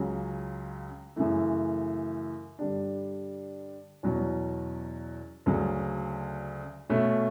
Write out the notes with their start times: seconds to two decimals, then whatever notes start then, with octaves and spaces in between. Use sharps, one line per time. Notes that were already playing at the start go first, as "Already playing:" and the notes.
Already playing: C#2 C#3 F#3
1.16 F#2 C#3 E3 A3
2.59 G2 D3 G3 D4
4.03 E2 B2 F#3 C#4
5.46 D2 C#3 F#3
6.90 B2 A3 C#4